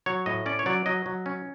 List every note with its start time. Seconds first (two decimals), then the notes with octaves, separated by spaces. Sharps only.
0.06 F#3 C#5
0.26 A2 D#5
0.46 C#4 D5
0.59 C#5
0.66 F#3 D5
0.86 F#3 D#5
1.06 F#3
1.26 C#4